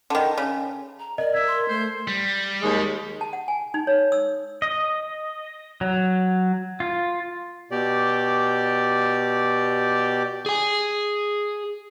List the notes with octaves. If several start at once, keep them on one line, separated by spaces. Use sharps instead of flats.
D3 D#3
C#3
A#5
A#4 D5 D#5
E5 G#6
C6
A3 C5
G3
D#2 G#3
A5
F#5
G#5
D#4
C#5
E6
D#5
F#3
F4
B2 G4 D5
G#4 G#5